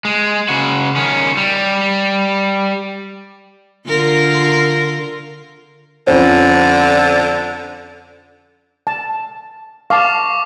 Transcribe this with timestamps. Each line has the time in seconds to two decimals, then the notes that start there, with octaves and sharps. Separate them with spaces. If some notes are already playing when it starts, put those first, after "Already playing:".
0.05 G#3
0.49 C#3 F#4
0.96 D#3 C#4
1.37 G3
3.87 D3 F4 A#4
6.07 F2 D3 C#4 C5
8.87 A5
9.90 F5 A5 C#6 D6